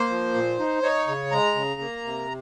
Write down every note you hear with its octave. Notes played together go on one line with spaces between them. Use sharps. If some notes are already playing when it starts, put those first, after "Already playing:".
Already playing: A#3 C5
F3
A#2
D#4
D#4 C#5
C#3
G#3 A#5
C#3
A#3
C3